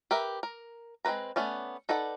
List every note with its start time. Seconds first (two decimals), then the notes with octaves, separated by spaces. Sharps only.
0.11 G4 A#4 B4 E5
0.43 A#4
1.05 G#3 C4 F#4 B4 A#5
1.36 A3 B3 C#4 D5
1.89 D#4 A4 B4 D5 F#5